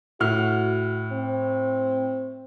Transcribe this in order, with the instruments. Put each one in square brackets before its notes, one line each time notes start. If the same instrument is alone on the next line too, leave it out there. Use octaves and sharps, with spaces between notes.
[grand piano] A2 F6 [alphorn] F#4
[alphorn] C4